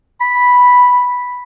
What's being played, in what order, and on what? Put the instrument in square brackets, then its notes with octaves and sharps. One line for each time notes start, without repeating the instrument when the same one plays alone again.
[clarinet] B5